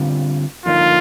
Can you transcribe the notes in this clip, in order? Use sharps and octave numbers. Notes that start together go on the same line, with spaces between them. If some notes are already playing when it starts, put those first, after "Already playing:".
Already playing: D3 G3 C4 F4
D3 F3 A#3 D#4 F4